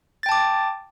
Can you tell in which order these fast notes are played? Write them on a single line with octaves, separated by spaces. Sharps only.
A6 G5 A5 D6